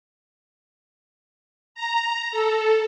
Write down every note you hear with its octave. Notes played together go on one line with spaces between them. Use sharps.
A#5
A4